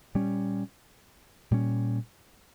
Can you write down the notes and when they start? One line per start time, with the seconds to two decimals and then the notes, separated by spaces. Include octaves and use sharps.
0.15 A#2 G3 C#4
1.51 A#2 G3 C#4